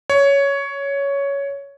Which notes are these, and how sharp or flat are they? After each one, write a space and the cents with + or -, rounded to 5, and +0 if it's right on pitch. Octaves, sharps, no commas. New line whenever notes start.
C#5 +10